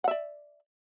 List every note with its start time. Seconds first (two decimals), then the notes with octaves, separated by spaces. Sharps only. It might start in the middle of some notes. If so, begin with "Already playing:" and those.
0.04 F#5
0.08 E5
0.11 D5